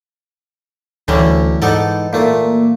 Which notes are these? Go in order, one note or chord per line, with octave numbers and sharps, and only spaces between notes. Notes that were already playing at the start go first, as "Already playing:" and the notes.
D2 D3 E3 F#3 G3 C#4
G#2 B3 D#4 A4 D5
A#2 A3 A#3